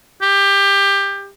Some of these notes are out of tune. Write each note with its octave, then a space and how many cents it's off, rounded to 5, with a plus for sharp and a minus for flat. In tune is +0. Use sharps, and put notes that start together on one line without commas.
G4 +20